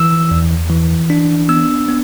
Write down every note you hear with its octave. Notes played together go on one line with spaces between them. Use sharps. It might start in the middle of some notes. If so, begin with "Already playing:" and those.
Already playing: E3 E6
E2
E3
D4
B3 E6
B3